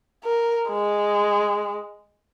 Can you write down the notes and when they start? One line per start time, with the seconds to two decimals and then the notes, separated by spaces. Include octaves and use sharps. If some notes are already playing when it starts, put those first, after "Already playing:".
0.24 A#4
0.69 G#3